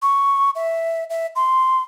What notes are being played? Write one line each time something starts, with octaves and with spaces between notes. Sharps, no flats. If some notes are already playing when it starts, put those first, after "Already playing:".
C#6
E5
E5
C6